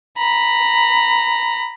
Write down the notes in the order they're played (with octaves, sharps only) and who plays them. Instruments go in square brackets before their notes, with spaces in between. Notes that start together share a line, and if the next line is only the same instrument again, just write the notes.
[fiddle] A#5 B5